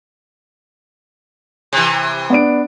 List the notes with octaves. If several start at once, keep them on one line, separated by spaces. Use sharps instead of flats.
C3 E3
B3 D4 D7